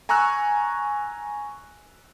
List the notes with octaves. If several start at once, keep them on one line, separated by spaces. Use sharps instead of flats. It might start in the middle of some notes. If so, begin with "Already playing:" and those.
G#5 A#5 C#6 E6 F#6